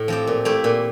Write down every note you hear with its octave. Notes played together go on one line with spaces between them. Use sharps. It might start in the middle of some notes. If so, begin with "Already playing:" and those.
Already playing: A2
F3 C4 G4
A#2
A3 E4 G4
A#2